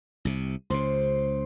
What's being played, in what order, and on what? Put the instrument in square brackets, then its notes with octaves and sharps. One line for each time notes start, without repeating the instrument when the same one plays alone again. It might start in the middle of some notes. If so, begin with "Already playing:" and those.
[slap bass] C2 C3
[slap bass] C#2 C#3 [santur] C5